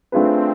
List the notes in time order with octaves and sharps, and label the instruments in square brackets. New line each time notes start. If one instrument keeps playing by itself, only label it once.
[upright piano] A3 D4 F4 G#4 B4 [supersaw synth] C4